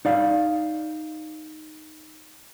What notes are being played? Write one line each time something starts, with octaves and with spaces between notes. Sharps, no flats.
D#4 D5 F5